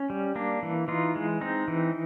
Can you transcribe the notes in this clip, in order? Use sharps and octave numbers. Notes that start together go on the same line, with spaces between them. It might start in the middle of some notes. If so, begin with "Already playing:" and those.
Already playing: C#4
G3
A#3 D4
E3
E3 D#4 F4
G#3
C4 D#4
E3